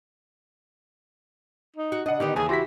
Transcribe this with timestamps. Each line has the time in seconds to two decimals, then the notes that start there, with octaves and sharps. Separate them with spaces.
1.76 D#4
1.92 F#4
2.06 C#3 D4 D#5 F#5
2.20 D3 D#3 B3 D#4 G4
2.36 D#2 C#3 E3 G#4 G#5
2.49 E4 F#4 G4 C6 A#6 B6